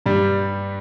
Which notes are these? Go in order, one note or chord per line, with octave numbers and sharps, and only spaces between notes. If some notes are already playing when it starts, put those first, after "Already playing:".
G2 G3